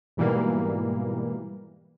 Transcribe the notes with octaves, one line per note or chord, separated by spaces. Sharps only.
G#2 B2 E3 G3 A#3